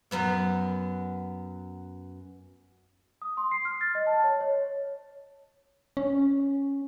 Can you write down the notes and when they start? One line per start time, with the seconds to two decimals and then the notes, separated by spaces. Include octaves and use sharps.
0.11 F#2 B3 F#5
3.22 D#6
3.37 C6
3.51 C7
3.65 F6
3.81 A6
3.95 D#5
4.07 A5
4.23 C#5
4.41 C#5
5.97 C#4